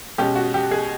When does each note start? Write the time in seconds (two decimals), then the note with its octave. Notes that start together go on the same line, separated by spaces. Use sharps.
0.18 B2 G#3 C#4 G4
0.36 F#4
0.54 G4
0.71 G#4